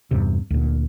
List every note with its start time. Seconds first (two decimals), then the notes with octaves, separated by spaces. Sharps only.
0.11 E2 G2 C3
0.50 D2 A#2